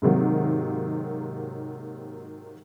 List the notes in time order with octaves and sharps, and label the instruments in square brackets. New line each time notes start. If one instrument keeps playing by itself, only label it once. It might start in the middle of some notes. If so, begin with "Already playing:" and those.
[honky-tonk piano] G#2 C3 D#3 F#3 A#3